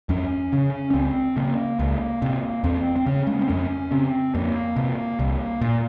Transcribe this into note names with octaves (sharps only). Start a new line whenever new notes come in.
F2 C#4
C#3
C#4
C#2 C4
C#3 A#3
C#2
C3
E2 C4
C4
C#3 C#4
G#3
A#3
C4
F2 C#4
C#3 C4
F2 A#3
C3
C2
A#2